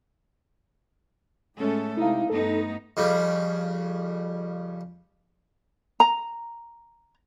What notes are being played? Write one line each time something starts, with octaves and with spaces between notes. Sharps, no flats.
A2 G#3 A3 C#4 A4
C3 G#3 D#4 E4 F5
G2 A3 B3 D#4 A4
F2 C#3 G3
A#5